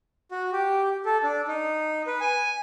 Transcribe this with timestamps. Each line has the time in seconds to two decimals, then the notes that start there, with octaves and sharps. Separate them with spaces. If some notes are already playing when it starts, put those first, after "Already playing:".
0.31 F#4
0.53 G4
1.06 A4
1.23 D4
1.48 D#4
2.07 B4
2.21 G#5